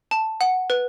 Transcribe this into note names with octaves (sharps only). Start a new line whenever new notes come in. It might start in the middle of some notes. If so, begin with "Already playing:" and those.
A5
F#5
B4